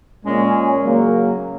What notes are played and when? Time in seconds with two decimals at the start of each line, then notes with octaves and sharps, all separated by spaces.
0.24 A#2 G#3 C#4
0.82 C#3 F#3 A#3 C#4